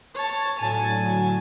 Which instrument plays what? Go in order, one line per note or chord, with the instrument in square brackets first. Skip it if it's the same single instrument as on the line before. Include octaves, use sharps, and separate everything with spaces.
[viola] C#5 A5
[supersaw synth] A2 D3 F#3 [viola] G#5 A5